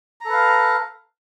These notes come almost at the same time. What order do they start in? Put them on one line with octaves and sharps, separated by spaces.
A#5 A4 B4 F5